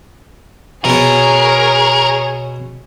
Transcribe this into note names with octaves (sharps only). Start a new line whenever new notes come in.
B2 B3 G#4 A#4 C#5